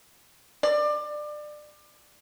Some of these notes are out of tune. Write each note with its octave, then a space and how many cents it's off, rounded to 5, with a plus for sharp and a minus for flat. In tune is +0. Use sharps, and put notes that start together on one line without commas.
D5 +25